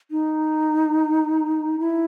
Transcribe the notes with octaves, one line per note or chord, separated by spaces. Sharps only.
D#4
E4